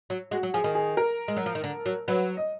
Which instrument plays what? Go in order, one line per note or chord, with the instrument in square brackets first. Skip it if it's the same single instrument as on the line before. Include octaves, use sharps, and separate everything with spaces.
[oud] F#3
[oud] G#3 [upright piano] F#4
[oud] F#3
[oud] F3 [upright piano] G#4
[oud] D#3
[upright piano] G#4
A#4
[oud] G#3
F#3
F3
D#3
D3
F#3
[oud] F#3 [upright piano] B4
[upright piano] D#5